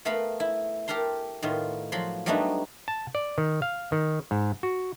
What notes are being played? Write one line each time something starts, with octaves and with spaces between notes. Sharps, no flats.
A3 B3 A#4 F5 B5
E4
G4 A4 A#4 A#5 C6
A2 D#3 B3 F4
F3 F#3 B5 C6
F#3 G3 A3 B3 D4 D#4
A5
D5
D#3
F5
D#3
G#2
F#4